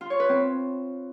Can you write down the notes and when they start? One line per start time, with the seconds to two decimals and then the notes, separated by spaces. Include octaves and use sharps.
0.01 F4
0.10 C#5
0.20 B4
0.29 C4